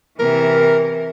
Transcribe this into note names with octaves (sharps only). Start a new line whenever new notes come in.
C3 E3 A#4